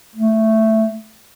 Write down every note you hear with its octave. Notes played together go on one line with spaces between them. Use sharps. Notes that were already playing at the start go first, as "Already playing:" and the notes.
A3